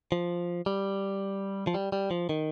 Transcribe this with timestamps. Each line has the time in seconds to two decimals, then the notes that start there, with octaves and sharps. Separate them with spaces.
0.12 F3
0.66 G3
1.67 F3
1.74 G3
1.92 G3
2.11 F3
2.29 D#3